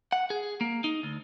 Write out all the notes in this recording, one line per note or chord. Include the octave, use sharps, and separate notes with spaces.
F#5
G#4
A#3
D#4
D2